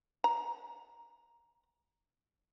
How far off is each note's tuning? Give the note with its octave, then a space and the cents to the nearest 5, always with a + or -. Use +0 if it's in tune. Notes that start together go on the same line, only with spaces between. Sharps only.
A#5 +0